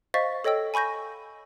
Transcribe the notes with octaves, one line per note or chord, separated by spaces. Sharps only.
C5 D#5 F5 C#6 A6 B6
A4 C#5 D#5 G5 E6
G#5 B5 C#6 G6 A#6